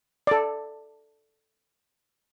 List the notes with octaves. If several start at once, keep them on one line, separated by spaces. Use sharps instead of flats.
A4 D5